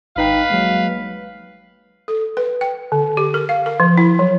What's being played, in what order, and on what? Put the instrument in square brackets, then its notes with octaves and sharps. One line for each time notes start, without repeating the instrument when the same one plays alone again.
[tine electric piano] G#1 D#4 G5 [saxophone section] B4 F5
[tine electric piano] F#3 G#3 A#3
[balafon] A4
B4
G5
D3
G4
A#4
F5
A#4
F3
E4
F#3